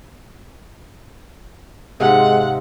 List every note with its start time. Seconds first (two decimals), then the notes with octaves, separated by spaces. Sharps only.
2.00 G#2 C3 G#3 F5 F#5